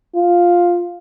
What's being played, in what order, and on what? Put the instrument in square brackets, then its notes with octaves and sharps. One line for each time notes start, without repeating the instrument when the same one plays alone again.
[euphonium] F4